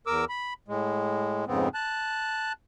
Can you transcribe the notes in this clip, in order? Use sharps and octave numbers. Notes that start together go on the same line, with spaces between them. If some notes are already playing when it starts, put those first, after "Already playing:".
E2 A#4 D6 E6
B5
A2 G#3
F2 G#2 C#3 B3 C4
A5 F#6